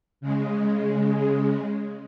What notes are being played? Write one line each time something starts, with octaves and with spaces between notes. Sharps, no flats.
C#3 G#3